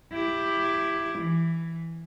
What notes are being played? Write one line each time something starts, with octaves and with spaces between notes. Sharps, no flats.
E4 G4
E3